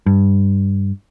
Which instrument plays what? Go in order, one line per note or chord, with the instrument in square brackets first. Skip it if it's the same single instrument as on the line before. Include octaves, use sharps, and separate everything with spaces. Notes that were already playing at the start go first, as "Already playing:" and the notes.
[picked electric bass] G2